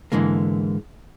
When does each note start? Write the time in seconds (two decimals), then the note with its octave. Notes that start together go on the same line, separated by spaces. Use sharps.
0.12 G#2 D3 E3 G#3 A#3